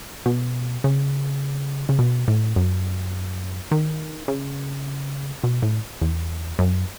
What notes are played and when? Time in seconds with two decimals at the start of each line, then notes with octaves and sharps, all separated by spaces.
0.26 B2
0.84 C#3
1.89 C#3
1.99 B2
2.28 A2
2.56 F#2
3.72 D#3
4.28 C#3
5.44 B2
5.63 A2
6.02 E2
6.59 F#2